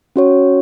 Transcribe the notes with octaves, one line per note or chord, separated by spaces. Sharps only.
C#4 F#4 C#5